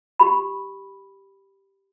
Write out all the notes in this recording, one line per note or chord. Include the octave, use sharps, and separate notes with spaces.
G4 B5